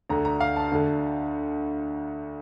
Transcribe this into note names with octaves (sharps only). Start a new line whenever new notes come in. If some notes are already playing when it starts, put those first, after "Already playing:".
D2 D3 A#5
A#5
F5
A5
D2 D3